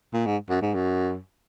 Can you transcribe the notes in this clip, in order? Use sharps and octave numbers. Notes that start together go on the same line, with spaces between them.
A#2
G#2
F#2
G#2
F#2